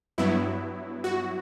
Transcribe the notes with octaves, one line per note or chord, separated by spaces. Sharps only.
G2 F#3 B3 E4
F#4